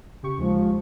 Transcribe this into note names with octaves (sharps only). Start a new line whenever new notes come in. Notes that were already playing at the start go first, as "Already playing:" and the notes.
C#3 G4 C#6
D#2 F3 G#3